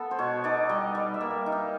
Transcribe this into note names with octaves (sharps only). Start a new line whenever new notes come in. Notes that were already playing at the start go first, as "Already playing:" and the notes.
Already playing: B3 A4
C5
B2 C#5
D#4 D5
G3 D#5
G3 D5
E5
A#3
D#4
F5